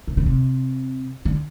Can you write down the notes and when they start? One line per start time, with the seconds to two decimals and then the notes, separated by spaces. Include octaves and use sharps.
0.08 C3
0.17 C#3
0.26 C3
1.25 D3